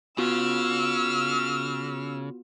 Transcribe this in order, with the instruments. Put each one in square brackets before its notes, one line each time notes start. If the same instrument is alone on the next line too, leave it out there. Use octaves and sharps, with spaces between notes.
[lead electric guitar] C#3 [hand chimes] B3 F4 F#4 [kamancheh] E6 F6